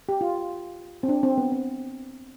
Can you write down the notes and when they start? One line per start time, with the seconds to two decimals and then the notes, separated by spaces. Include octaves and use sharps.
0.09 G4
0.21 F4
1.03 C4
1.09 D4
1.23 C4
1.38 B3
1.52 C4